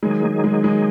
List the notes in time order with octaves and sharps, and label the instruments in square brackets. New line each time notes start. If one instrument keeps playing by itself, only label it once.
[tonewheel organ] D#3 F#3 D#4 G#4 [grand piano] G#3
[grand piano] G#3
G#3
G#3